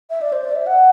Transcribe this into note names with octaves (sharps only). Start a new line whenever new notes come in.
E5
D5
C5
D5
E5
F#5